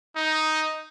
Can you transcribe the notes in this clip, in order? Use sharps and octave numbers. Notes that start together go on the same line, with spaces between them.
D#4